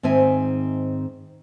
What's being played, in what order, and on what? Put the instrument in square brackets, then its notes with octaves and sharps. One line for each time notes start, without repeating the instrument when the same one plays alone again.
[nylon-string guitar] G#2 D#3 C4 E5 G#5